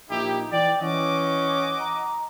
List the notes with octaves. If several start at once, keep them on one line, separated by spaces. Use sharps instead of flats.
A#1 D#4 E4 G4
E3 D5 G5
E3 C#4 D#5 F#5 D6
A#5